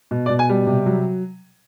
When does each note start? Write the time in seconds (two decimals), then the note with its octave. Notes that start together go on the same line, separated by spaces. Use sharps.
0.11 B2
0.26 D5
0.30 B2
0.39 G#5
0.49 G3
0.67 C3
0.86 F#3